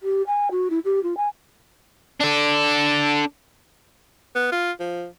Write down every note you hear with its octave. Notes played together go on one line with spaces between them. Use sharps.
G4
G#5
F#4
E4
G4
F4
G#5
D4 A4
B3
F4
F3